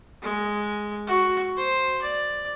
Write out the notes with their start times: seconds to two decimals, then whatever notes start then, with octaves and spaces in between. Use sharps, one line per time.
0.22 G#3
1.07 F#4
1.57 C5
2.02 D5